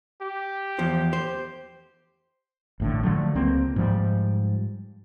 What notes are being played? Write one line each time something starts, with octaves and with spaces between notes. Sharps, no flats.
G4
E2 F3 C5
C5
A1 A2 D3
D3 F3 F#3 A3
C#2 A#3 C4
G#2 F3 G3